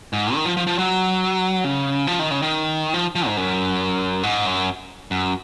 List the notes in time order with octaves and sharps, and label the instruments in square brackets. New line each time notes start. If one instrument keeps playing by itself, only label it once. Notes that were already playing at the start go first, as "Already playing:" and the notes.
[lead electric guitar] G#2
D#3
F3
F3
F3
F#3
C#3
F3
D#3
C#3
D#3
F3
F3
G#2
F#2
G#2
F#2
F#2